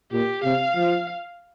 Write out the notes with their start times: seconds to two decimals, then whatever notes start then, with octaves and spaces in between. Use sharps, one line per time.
0.12 A#2 G4
0.44 C3 F5
0.75 F3